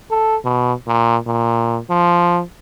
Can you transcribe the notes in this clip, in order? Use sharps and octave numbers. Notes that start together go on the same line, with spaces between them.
A4
B2
A#2
A#2
F3